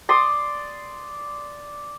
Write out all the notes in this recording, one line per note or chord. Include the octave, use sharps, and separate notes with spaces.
D5 C6 D#6